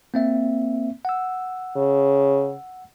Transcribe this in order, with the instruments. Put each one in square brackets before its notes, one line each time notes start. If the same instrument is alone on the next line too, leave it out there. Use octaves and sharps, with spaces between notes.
[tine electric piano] A#3 C4 E5
F#5 E6
[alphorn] C#3